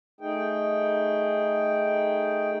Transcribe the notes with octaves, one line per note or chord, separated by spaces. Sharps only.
A3 D#4 G#4 G5